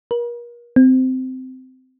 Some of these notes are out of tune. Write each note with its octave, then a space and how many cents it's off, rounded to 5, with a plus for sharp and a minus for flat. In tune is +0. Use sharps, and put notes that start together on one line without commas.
A#4 +35
C4 -20